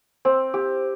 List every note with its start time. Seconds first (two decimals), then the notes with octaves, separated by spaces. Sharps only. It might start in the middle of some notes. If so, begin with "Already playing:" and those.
0.25 C4
0.54 G4